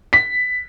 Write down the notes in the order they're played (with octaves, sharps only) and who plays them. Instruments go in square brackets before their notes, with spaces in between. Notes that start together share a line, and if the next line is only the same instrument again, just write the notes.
[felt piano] B6